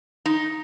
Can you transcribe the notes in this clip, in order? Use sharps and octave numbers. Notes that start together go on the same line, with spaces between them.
D#4